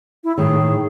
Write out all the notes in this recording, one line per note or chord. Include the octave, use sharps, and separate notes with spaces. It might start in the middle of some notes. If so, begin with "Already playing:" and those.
E4
A2 D#3 G#4